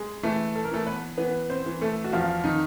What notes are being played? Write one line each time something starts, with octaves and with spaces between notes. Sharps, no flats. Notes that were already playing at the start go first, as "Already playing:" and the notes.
Already playing: G#3 G#4
E3 A3 A4
A4
A#4
E3 A3 A4
B3 B4
E3 B3 B4
C4 C5
E3
A3 A4
F#4
E2 F3 F4
D#3 D#4